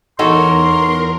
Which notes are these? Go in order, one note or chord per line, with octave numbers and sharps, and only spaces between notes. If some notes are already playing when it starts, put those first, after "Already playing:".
E2 D#4 F#4 A4 A#4 C#5 C6